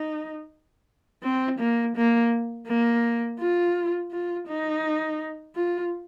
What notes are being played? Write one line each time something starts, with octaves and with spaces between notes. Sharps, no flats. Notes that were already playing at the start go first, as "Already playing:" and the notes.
Already playing: D#4
C4
A#3
A#3
A#3
F4
F4
D#4
F4